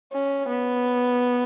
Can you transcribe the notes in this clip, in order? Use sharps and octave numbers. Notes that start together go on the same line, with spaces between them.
C#4
B3